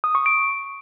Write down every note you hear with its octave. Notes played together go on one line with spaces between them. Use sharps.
D#6
C#6
D7